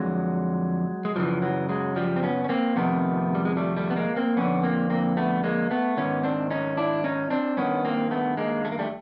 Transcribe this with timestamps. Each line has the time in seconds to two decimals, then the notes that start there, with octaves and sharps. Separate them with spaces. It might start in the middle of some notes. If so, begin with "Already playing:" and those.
Already playing: F2 D3 F#3 G#3
1.05 G#3
1.16 F#2 C#3 E3 F3 G3
1.42 E3 F#3
1.69 F#3 G#3
1.96 F3 G3
2.16 C4
2.23 B3 C#4
2.44 C#4
2.49 A#3 C4
2.76 F2 C3 D#3 A3 B3
3.35 G3
3.45 G#3
3.57 G3 A3
3.77 G3 A3
3.90 B3
3.96 G#3 A#3
4.16 A#3 C4
4.37 F2 D3 B3 C#4
4.64 A#3 C4
4.90 A#3 C4
5.17 A3 B3
5.44 G#3 A#3
5.71 A3 B3
5.97 G#2 D#3 B3 C#4
6.23 C4 D4
6.51 C#4 D#4
6.77 D4 E4
7.04 C#4 D#4
7.30 C4 D4
7.57 G2 D#3 B3 C#4
7.85 A#3 C4
8.11 A3 B3
8.37 G#3 A#3
8.65 A3
8.72 A#3
8.79 G3 A3